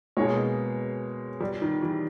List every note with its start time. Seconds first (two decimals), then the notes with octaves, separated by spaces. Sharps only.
0.17 B2 G#3 A#3 D#4 G#4 C#5
1.40 G3
1.62 D#3
1.82 E3